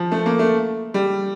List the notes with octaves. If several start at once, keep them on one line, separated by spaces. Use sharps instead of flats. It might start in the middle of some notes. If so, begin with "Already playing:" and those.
Already playing: F3
A3
A#3
A3
G3